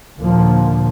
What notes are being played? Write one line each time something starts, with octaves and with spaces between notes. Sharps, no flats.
D#2 A#2 D3 F3 A#3